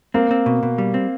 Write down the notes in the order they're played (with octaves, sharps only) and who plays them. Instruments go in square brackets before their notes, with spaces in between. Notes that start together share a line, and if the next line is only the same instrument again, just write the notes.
[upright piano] A#3 [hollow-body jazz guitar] C4
[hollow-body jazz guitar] C4
B2
B2
G3
C4